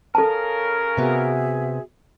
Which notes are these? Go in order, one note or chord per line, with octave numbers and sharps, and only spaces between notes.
C#3 A4 A#4 A5
C3 B3 F#4 G#4 E5